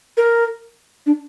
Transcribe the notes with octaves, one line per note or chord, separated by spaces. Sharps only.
A#4
D4